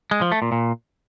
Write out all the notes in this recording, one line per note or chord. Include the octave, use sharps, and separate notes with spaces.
G#3
F3
A3
A#2
A#2